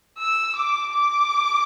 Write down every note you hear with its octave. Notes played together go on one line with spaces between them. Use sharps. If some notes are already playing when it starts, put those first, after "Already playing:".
E6
D6
D6